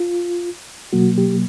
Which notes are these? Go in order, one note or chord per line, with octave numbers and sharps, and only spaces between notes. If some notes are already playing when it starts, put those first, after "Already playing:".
Already playing: F4
B2 F#3 A#3 F#4
G4